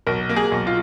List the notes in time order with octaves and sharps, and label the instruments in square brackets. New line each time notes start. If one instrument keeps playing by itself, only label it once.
[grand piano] B1 A#4
A#3
G#4
B1
F4